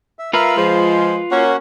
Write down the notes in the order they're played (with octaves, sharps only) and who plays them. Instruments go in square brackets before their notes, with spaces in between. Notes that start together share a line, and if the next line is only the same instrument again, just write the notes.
[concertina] E5
[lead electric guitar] F4 B4 [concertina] A#4 E5 F5
[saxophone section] F3 G#3 [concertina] C5
[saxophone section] A#3 C#4 [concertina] F#4 F#5